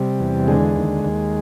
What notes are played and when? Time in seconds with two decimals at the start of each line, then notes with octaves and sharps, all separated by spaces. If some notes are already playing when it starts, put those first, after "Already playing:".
Already playing: C3 G3
0.20 E2
0.47 D3 G#3
0.76 D#2
1.05 D#2